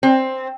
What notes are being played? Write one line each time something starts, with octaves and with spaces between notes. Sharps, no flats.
C4